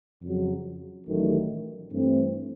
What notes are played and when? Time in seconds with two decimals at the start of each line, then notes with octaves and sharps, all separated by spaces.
0.22 F2 C#3 F#3
1.07 A1 G2 D#3 F#3 A3
1.90 G2 E3 A3 C4